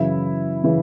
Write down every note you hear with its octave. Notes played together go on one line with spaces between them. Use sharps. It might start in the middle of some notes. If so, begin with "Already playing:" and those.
Already playing: F#2 C#3 E3 E4
C#3 E3